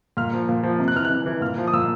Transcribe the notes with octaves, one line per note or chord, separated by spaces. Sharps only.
A#2 F6
F3
A#2
F3
C3
F#6
E3 F6
F#6
C3
E3
A#2 F6
F3
D#6
A#2 E6